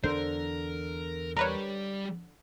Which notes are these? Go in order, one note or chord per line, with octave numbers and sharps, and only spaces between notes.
E2 D3 C#4 D4 A#4 C5
G3 A#4 B4 C#5 D5